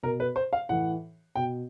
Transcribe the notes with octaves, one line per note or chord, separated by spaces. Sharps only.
B2 A#4
B4
C5
F5
A2 E3 F#5
B2 G5